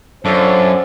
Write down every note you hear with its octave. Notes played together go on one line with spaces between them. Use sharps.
F#2 D4 F4 A4 C5